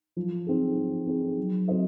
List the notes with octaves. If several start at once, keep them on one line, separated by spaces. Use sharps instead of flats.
F3
C4 D#4 G#4
F3
C4 D#4 G#4
F#3
C4 F#4 C5 D#5